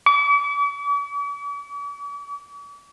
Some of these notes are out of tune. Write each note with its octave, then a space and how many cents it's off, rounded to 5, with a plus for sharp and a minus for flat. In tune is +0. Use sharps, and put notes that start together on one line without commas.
D6 -45